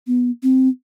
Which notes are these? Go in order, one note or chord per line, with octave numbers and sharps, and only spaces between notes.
B3
C4